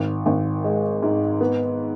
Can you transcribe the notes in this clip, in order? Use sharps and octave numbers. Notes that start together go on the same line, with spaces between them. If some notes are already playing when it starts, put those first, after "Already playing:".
Already playing: G#1
G#1
G#3
G#2
B3